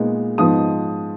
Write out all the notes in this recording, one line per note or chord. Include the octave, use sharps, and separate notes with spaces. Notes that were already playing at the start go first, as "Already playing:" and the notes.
Already playing: A#2 G#3 B3 D#4
G#2 F3 B3 D#4 D#6